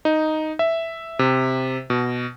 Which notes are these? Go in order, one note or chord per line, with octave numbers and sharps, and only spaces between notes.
D#4
E5
C3
B2